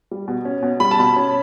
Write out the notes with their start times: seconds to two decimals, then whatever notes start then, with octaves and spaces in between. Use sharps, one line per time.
0.11 G3
0.28 B2
0.45 C#4
0.63 B2
0.80 G3 B5
0.91 A5
0.99 B2 B5
1.16 C#4